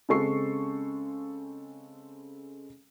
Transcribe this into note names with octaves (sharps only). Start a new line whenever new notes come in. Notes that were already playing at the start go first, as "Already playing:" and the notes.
C#3 G#3 C4 A4 C#6 C7